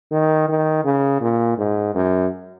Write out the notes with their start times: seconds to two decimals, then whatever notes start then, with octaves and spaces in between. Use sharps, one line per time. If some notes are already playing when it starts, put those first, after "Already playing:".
0.12 D#3
0.49 D#3
0.85 C#3
1.21 A#2
1.58 G#2
1.95 F#2